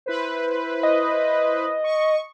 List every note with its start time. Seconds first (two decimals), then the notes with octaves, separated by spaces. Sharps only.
0.06 E4 B4 C5
0.83 D#5
1.84 C#6